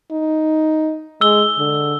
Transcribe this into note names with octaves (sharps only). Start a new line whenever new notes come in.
D#4
G#3 E6 G7
D3